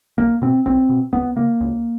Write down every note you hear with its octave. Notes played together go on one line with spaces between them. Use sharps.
B1 A#3
B2 C4
B1 C4
B2
C#2 B3
C#3 A#3
C#2